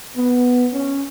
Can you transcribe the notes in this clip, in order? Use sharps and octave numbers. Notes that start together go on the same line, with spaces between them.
B3
C#4